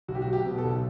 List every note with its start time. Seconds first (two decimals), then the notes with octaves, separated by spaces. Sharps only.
0.08 B1 F#4
0.15 G4
0.22 F#4
0.27 F#3
0.33 G4
0.46 B2
0.58 A4
0.65 B1